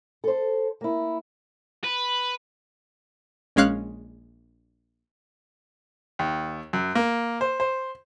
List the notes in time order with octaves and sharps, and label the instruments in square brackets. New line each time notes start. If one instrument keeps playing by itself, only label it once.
[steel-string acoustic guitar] A4 C5
A#3 E4
[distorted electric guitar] B4
[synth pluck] A#1 G#3 C#4 F5 F#6
[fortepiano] D#2
F#2
A#3
C5
C5